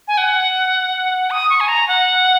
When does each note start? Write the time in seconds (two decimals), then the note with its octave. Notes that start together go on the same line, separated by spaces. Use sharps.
0.08 G#5
0.18 F#5
1.31 D#6
1.50 C#6
1.60 G#5
1.68 A#5
1.88 F#5